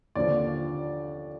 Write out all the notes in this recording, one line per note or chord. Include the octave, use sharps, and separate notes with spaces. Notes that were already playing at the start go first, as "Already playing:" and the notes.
D#2 D3 F3 D5